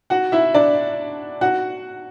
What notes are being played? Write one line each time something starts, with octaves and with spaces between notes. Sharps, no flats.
F#4 F#5
E4 E5
D4 D5
F#4 F#5